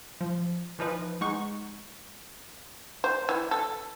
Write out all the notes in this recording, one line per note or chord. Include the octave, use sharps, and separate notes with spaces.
F3
E3 F3 D#4 B4
G#3 D#4 F#5 C#6
C5
E3
A4